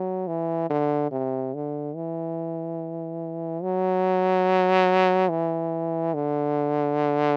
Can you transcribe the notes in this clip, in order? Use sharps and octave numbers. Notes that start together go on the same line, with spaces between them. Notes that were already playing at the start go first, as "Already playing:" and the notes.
Already playing: F#3
E3
D3
C3
D3
E3
F#3
E3
D3